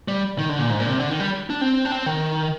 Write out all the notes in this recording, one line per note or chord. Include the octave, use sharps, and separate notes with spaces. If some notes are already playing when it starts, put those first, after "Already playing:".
G3
D#3
D3
A#2
G#2
A#2
D3
C3
D3
D#3
G3
D4
C4
D4
C4
D#3